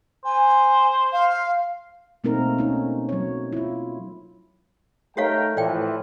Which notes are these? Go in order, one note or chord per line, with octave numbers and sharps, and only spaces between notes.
C5 G#5
F5
B2 A3 A#3 C4 D#4 A#4
C#4 D#4
F#3 C#5
E4 F4
A3 D#4 G4 A#4 C#5 F5 G5
A2 E3 F3 D5 G5